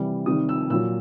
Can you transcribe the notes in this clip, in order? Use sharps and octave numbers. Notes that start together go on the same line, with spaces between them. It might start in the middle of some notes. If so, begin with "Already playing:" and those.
Already playing: C3 E3 G3
C3 D#3 G3 D#6
E6
A#2 F#3 E6